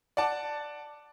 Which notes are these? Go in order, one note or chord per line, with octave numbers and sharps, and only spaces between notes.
D5 F#5 A5